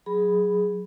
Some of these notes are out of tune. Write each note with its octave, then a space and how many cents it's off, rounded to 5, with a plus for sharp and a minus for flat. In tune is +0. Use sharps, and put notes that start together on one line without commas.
F#3 +0 G#4 +0 B5 +0